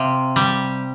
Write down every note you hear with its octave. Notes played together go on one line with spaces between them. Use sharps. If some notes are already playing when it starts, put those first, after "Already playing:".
Already playing: C3 F5
G3